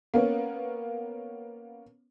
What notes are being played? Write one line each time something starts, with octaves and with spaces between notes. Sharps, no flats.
A#3 B3 C#4